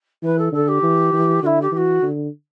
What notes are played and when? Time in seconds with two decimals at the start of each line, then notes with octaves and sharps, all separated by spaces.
0.23 E3 B4
0.38 A4
0.52 D3 A4
0.68 G4
0.82 E3
1.13 E3
1.42 D3 E4 F#4
1.61 G4
1.72 E3 G4
1.76 F#4
2.02 D3